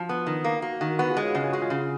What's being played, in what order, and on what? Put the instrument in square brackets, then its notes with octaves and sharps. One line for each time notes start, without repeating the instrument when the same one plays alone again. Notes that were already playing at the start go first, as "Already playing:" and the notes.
Already playing: [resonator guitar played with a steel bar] F3 [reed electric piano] F#4
[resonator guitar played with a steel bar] B3
D#3
A#3
[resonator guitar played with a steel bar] A#3 [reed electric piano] F#4
[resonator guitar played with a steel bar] D#3 [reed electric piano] F#4
[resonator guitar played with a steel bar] B3 [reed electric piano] F#4
[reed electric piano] F4 G#4
[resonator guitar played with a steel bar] G#3
[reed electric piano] C#5 F5
[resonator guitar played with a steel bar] C#3 [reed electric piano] D#5 F#5
[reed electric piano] F4 G#4
[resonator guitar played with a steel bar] G#3 [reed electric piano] F#4
[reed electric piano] F4 G#4
[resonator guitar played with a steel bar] C#3